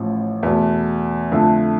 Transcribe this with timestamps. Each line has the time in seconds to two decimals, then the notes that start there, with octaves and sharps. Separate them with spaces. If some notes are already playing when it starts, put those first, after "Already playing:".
Already playing: A1 A2 F3
0.43 E2 B2 A3
1.32 F2 D3 A3